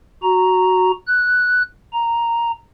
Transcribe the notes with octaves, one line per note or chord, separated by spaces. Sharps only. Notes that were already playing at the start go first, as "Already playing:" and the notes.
F#4 A#5
F#6
A#5